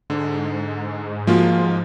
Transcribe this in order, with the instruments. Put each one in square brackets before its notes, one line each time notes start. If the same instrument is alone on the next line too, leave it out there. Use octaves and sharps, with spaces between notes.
[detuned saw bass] G#2 [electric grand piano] D3
[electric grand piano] F3 G#3 F4 [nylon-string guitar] A#3 F#4